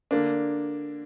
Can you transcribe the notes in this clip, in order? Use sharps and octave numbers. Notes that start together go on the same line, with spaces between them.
D3 A#3 D4